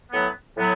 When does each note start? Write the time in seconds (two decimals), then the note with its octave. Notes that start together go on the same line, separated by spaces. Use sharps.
0.11 A2 F#3 B3
0.57 A2 F#3 B3